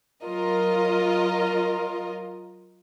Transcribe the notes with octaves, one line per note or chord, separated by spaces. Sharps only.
F#3 F4 A#4 D#5